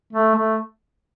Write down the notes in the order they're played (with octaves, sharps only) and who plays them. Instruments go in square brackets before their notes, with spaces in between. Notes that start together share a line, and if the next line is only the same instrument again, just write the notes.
[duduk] A3
A3